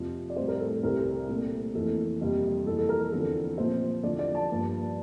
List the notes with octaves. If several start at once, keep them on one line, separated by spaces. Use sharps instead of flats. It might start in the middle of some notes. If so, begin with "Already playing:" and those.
Already playing: F2 C3 F3
D5
A2 G3 C4 C5
A#4
A4
A4
C2 C3 G3 C4 A#4
A#2 A3 C4
F2 E3 A#3 A4
F2 C3 G3 A#3
F2 E3 A#3 A4
A4
A#4
A4
E2 D3 F3 C4 A4
A#2 F3 C4 C5
E2 D3 F3 D5
D5
A5
G2 F3 A#3